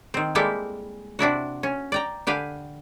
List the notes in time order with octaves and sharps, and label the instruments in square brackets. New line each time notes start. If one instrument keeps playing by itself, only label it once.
[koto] D#3 C4
G3 G#3 A#3 E4 G4 A4
C3 D4 E4 F#4
C#4
D5 G5 A#5
D3 G4 B4 F5 G#5